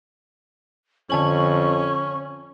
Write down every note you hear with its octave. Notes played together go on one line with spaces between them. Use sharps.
F2 D3 C#4 G#5 C#6 F#7